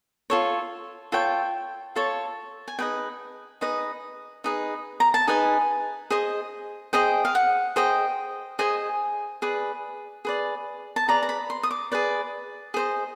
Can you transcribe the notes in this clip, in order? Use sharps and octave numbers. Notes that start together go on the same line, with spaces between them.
F4 A4 C#5
F4 A4 C#5 G5
F4 A4 C#5 A5
G#5
D#4 G#4 B4 D#5 G5
D#4 G#4 B4 D#5
D#4 G#4 B4 D#5
A#5
A5
D#4 G#4 B4 D#5 G#5
G#4 C5 D#5
G#4 C5 D#5 G5
F5
F#5
G#4 C5 D#5 G5
G#4 C5 D#5 G#5
G#4 B4 D5
G#4 B4 D5
A5
G#4 B4 D5 A#5
A#5
B5
C6
D#6
D6
G#4 B4 D5
G#4 C5 D#5